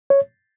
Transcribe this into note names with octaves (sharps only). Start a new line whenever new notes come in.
C#5